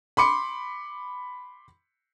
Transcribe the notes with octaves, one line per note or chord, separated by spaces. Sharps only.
B5 C6 D6 C#7